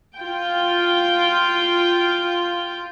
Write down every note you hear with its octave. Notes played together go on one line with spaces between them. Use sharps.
F4 G5